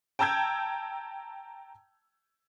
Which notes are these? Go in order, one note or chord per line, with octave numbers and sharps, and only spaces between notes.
G5 A5 A#5 E6 G6 G#6